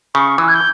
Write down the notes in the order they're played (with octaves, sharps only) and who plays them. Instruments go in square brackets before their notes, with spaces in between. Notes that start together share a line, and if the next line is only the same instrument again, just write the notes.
[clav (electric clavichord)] C#3 [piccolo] C#6
[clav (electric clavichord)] E3 [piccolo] E6
[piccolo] G#6
G6